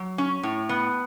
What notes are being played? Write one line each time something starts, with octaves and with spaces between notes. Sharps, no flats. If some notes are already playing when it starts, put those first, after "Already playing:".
Already playing: F#3
C#4
A2
B3